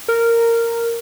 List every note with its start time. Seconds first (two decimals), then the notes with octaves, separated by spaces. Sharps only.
0.08 A#4